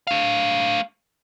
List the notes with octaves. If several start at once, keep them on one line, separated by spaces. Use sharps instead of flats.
A3 F5